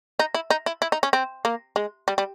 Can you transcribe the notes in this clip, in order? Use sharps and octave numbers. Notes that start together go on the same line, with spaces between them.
D#4
E4
D#4
E4
E4
D#4
C#4
C4
A#3
G#3
G3
G3